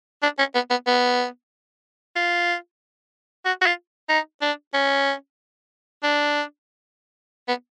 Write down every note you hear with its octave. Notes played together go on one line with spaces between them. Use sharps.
D4
C#4
B3
B3
B3
F4
F#4
F#4
F4
D#4
D4
C#4
D4
B3